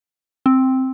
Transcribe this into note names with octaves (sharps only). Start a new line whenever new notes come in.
C4